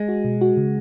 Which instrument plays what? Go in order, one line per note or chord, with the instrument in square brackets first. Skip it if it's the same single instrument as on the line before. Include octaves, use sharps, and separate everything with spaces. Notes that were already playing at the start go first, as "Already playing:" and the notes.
Already playing: [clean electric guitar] G#3
[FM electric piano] F#4
B2
F#4
C#3